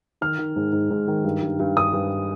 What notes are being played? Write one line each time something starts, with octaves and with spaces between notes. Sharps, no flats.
D#3 F6
D#3
G#2
G#2
G#2
D#3
G2
G2
G2
G2 D#6
G2